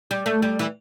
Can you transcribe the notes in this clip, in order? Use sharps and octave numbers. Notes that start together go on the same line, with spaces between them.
G3
A3
G3
E3